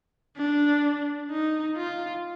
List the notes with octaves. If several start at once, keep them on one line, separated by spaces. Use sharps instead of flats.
D4
D#4
F4